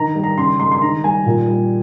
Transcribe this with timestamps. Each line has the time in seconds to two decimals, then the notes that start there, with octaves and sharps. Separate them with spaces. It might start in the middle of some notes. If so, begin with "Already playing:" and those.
Already playing: D#3 A#5
0.15 G3
0.23 A#5
0.38 C#3 C6
0.60 G#3 C6
0.72 C6
0.81 D#3 A#5
1.04 G3 G#5
1.26 A#2
1.47 G3